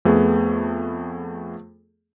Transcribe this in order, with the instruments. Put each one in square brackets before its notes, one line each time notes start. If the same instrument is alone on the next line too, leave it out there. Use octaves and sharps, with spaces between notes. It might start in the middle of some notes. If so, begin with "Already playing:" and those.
[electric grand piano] F2 A3 B3 G#4